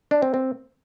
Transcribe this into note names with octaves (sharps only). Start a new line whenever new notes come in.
D4
C4
C4